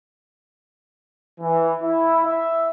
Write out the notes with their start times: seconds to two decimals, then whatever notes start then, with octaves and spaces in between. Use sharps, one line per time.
1.40 E3
1.82 E4
2.25 E5